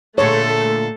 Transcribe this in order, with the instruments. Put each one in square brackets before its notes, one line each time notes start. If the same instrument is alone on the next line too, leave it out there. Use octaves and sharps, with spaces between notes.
[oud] A#2 D3 G#3 [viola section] A3 [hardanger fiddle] A4 [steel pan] C#5